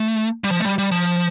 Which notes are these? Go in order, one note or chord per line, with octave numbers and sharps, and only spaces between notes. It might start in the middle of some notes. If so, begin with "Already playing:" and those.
Already playing: A3
G3
F3
A3
G3
G3
F3